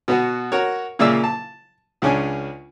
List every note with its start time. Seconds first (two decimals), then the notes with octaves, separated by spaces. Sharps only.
0.08 B2 B3 F#4
0.52 F#4 A#4 C#5
0.99 A#2 C#3 A#3 D5 E5 E6
1.24 A5
2.02 C#2 C#3 C#4 D4 G#5